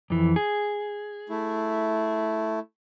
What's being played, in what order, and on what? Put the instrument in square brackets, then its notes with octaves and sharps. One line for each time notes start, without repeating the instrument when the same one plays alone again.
[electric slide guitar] F2 E3
G#4
[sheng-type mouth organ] A3 E4